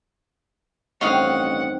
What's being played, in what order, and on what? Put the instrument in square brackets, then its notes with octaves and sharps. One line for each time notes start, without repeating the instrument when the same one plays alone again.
[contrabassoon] A1 [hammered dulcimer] G2 D#3 C4 [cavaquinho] C#5 D#5 F5 [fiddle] F#5